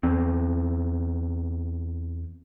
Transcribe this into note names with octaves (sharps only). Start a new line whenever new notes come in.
E2 C4